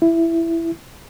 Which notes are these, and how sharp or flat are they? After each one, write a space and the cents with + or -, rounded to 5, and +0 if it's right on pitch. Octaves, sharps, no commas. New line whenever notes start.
E4 +10